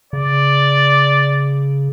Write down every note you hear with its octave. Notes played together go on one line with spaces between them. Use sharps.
C#3 D5